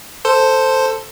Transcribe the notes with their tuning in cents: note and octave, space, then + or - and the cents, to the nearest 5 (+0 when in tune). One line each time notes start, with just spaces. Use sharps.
A4 +10 C5 +0